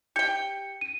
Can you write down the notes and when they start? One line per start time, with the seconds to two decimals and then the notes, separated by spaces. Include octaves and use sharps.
0.16 G4 G5 C#7
0.81 D#7